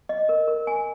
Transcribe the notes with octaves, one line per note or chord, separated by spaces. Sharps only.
D#5
A#4
A#4
G#5